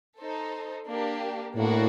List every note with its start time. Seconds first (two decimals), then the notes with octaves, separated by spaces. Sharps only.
0.19 D#4 A4 C5
0.87 A#3 D4 G4
1.56 A2 A#3 D4 F#4